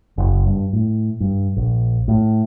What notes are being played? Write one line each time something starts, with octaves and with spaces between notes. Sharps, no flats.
F#1
G2
A2
G2
A#1
A2